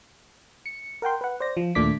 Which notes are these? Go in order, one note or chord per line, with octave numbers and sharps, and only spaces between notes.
C#7
A#4 F#5 G5 C6
B4 F#5
C5 D5 A#6
F3
D#2 A#2 A3 D4 D6 B6